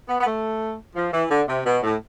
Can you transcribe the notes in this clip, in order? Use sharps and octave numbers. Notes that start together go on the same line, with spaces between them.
B3
B3
A3
F3
E3
D3
C3
B2
A2